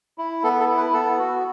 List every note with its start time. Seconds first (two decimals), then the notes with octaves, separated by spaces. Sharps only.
0.18 E4
0.43 B3 A4
0.60 A4
0.69 E4
0.77 B4
0.93 B3 A4
1.19 F#4